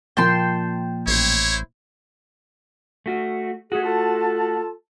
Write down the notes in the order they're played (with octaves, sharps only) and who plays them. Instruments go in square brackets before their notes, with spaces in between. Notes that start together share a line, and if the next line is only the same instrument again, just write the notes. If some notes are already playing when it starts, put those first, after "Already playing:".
[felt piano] A#2 F3 A#3 [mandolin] G5 A5 C6
[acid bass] A1 [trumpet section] E4 C5 C#5
[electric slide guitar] A3 F#4
[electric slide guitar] A3 F#4 [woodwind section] G#4
[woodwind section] F4 A4 A5